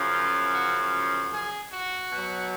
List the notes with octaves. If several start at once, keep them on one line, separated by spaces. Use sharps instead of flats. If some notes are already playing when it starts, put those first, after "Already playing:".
Already playing: F#2 C#3 F3
F4
F#4
F#4
G#4
F#4
B2 F#3